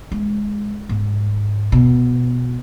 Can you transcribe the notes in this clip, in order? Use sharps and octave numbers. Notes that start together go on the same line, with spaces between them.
G#3
G#2
B2